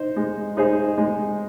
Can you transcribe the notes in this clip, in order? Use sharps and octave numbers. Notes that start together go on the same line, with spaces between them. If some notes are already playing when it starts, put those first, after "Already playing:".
Already playing: D#4 C5
G#3
D#4 G#4 C5
G#3